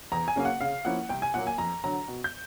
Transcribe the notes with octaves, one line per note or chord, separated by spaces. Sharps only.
E2 A#5
G#5
C#3 F#3 A#3 C#4 F5
F#5
C#3 F5
F3 A#3 C#4 E4 F#5
C2 G5
G#5
A#2 F#3 A#3 F#5
G#5
F2 A#5
D3 F#3 A#5
B2
G6